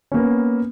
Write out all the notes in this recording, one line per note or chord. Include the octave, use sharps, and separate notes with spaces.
A#3 B3 C#4